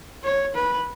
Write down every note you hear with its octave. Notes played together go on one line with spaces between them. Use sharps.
C#5
B4